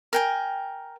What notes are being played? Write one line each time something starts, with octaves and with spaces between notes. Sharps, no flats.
A#4 G5 G#5